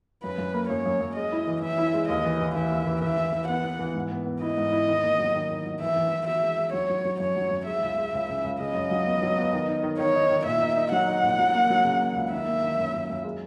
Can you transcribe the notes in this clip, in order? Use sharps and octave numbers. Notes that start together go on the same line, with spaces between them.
F#2 B4
F#2
A#3
F#2 C#5
F#2
F#2
G#3 D#5
E4
E3
E3 E5
E4
G#3
D#2 D#5
E3
E3
E3 E5
D#2
E3
E3 E5
E3
E3
B3 F#5
B3
E3
G#2
B3
B3
E4 D#5
G#2
E4
D#3
A#3
F#3
D#3
D#3
F#3
E3 E5
E3
E3
F#4 E5
G#3
G#3
F#3 C#5
F#3
F#3
F#2 C#5
F#3
F#2
G#3 E5
C#2
G#3
C#2
C#3
C#2
C#3 D#5
F#2
F#3
B3
F#3
B3
D#3
D#4
D#3
D#3 C#5
D#4
D#3
A#2 E5
D#4
D#4
F#3 F#5
D#4
A#2
F#3
A#3
F#3
C#3
A#3
C#2
D#3 E5
A#3
D#3
F#2
F#2
F#2
G#3